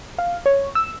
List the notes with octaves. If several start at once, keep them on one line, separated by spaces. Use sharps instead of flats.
F5
C#5
E6